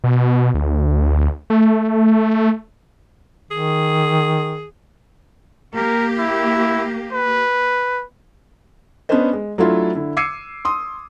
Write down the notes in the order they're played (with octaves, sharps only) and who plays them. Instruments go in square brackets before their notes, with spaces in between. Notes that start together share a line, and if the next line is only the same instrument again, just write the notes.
[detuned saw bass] B2
D2
A3
[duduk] D#3 [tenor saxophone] G#4
[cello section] A#3 G4 [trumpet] A#4
[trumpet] E4
B4
[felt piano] B3 C#4 D4 B4 C5 D#5
G#3
F#3 A3 D4 E4 F4
D3 E4
D6 E6 G#6 C7 C#7 D#7
C6 D#6